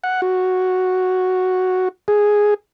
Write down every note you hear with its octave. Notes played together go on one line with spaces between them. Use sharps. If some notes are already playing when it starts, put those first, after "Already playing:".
F#5
F#4
G#4